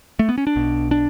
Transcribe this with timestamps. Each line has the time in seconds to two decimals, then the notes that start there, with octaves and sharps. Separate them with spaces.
0.19 A3
0.29 B3
0.38 C#4
0.47 D4
0.56 B1 B2
0.91 D4